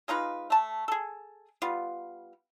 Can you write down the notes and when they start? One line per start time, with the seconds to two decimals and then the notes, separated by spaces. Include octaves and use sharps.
0.08 G#3 D#4 F4 B4
0.50 A3 A5
0.88 G#4 A4
1.62 G3 B3 F4